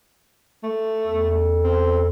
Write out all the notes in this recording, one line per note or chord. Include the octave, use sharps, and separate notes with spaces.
A3
E2 A4
C4